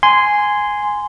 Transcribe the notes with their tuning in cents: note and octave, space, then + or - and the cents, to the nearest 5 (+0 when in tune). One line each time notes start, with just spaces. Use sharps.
G#5 +0 C6 -10